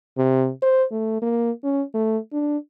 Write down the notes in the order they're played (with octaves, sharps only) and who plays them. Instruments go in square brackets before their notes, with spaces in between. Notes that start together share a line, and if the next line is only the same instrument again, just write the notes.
[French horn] C3
C5
A3
A#3
C#4
A3
D4